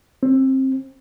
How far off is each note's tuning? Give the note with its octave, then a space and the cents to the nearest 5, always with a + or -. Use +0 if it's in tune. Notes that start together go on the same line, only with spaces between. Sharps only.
C4 +20